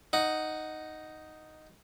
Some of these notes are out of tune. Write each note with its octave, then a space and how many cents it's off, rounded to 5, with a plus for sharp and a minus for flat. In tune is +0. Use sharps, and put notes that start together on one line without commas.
D#4 +0 F#5 +0